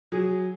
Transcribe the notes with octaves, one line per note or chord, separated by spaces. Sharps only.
F#3 G#4